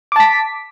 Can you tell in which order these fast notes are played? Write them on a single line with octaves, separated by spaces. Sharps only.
D6 A5 B6